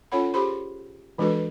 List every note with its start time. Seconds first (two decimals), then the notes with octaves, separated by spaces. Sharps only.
0.12 C#4 F4 A4 C#5 F#5 B5
0.34 G4 G#4 C5 B5 C6
1.18 E3 G#3 D4 F#4 A4 B4